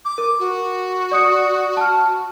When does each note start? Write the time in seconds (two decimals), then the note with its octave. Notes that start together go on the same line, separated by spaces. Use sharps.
0.05 D6
0.18 A#4
0.39 F#4
1.11 D5 D#6 C#7
1.77 A5 F6